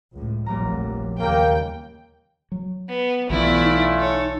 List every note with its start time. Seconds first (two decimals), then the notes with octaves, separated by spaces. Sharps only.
0.12 C#2 A2
0.46 F1 A#1 A#2 F#3 G3 A#5
1.20 D#2 C#3 A#3 G5
2.52 F#3
2.89 B3
3.30 B1 E3 A3 B3 C#4 E4 F4 D5
3.64 D#4
3.98 A4 C#5